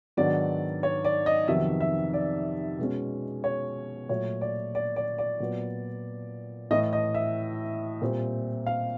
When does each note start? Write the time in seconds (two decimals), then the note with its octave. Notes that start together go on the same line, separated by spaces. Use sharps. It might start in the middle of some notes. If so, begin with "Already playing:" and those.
0.17 G#2 D#3 F#3 B3 D4 D5
0.83 C#5
1.05 D5
1.26 D#5
1.48 F2 C3 D#3 F#3 B3 E5
1.80 E5
2.13 D5
2.79 B2 G#3 C#4
3.44 C#5
4.09 A#2 F#3 A3 C#5
4.41 D5
4.75 D5
4.96 D5
5.18 D5
5.40 A#2 F#3 B3
6.71 A2 E3 A3 D#5
6.93 D#5
7.14 E5
8.02 A#2 G3 C4
8.66 F5